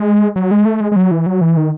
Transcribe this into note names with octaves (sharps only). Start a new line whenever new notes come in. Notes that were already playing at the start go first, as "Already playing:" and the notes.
Already playing: G#3
F#3
G#3
A3
G#3
G#3
F#3
E3
F#3
E3
D#3